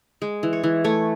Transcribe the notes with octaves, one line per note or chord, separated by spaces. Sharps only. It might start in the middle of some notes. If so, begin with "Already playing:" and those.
G#3
E3
C#5
E3
A3 C#5